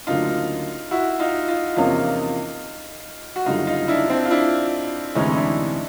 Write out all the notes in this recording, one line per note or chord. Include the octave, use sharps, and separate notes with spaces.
D2 C#3 F#3 A#3 D4 D#4 F4
E4 F#4
D#4 F4
D#4 F4
E2 C3 F3 A#3 C#4 D#4 F4
F#4
F#1 F#2 D3 G3 D#4 F4
D#4 F4
D4 E4
C4 D4
F4
D4 E4
D2 C3 E3 G#3 C#4 D#4
D#4
D4 E4